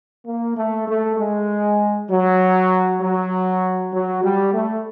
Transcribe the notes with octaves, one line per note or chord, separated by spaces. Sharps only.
A#3
A3
A3
G#3
F#3
F#3
F#3
G3
A3